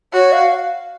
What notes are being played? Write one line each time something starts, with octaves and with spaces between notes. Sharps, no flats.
F#4 C#5
F5